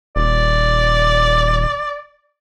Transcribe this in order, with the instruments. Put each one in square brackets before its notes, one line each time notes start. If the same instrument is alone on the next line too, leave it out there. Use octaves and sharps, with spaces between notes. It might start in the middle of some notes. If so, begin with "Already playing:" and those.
[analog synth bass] D#1 [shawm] D5